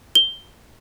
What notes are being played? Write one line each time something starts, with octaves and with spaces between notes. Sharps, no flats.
G7